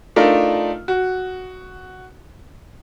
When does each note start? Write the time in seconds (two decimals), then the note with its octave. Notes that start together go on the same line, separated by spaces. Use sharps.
0.16 A3 D4 D#4 F4 A#4
0.88 F#4